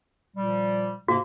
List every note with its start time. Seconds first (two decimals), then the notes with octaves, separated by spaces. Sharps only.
0.37 A#2 F3 G3
1.08 G#2 C3 A#3 F#4